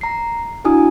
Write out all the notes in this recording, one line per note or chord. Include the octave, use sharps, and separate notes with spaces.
A#5 C7
D4 E4 F#4 G#5 D#6